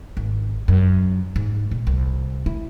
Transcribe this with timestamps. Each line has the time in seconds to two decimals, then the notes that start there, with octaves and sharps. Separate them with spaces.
0.17 G#1
0.68 F#2
1.36 G#2
1.71 A#2
1.87 C2
2.46 E4